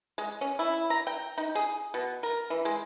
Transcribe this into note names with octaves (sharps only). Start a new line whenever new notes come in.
G#3
C#4
E4
A#5
G5
D#4
G#4
B2
A#4
E3
G#3